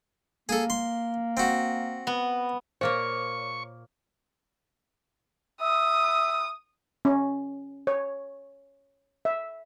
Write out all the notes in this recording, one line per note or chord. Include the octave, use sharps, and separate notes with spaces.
A#3 G#4 A4
C6
C4 F#4
B3
A#2 A#3 C5 C#5 C#6
E5 D#6
C#4
C#5
E5